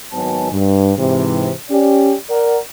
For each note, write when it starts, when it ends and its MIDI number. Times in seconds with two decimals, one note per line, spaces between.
0.13 0.49 32
0.13 0.49 51
0.13 0.49 54
0.13 0.49 59
0.13 0.49 80
0.13 0.49 81
0.52 0.93 43
0.97 1.50 44
0.97 1.50 48
0.97 1.50 52
1.70 2.13 61
1.70 2.13 67
1.70 2.13 74
2.29 2.57 70
2.29 2.57 74
2.29 2.57 78